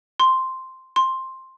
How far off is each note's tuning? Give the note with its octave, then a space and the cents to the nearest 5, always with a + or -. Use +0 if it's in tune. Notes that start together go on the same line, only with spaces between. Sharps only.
C6 +0
C6 +10